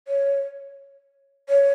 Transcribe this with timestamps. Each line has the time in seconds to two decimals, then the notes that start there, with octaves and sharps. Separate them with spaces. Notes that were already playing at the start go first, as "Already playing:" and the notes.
0.08 C#5
1.49 C#5